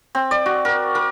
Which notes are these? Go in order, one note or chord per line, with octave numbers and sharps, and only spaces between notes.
C4
D5
F#4
A#4
A#4